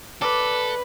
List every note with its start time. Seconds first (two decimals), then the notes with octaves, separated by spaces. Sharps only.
0.22 A4 B4 D5